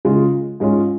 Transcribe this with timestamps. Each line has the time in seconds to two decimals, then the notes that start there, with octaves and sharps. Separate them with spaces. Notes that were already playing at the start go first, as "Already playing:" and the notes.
0.05 C#3 G#3 F4
0.60 G#2 G#3 C#4 F4